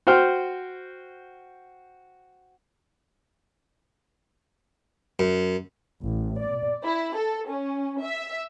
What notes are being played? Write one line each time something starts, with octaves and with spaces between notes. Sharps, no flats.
F#4 C5 G5 F6
F#2
A1
D5
E4
A4
C#4
E5